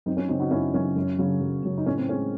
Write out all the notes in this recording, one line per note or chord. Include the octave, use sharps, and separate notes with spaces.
F#2 C4 D#4
C#4
C#3 F#3 C4 D#4
D#4 F#4
F#2 C#4 E4
C#3 F#3 C#4
F#2
C#3 F#3
F#2
C#3 F#3
D#4
A2 C#4
C4
G#3 C#4